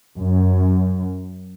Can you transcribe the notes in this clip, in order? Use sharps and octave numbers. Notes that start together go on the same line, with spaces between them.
F#2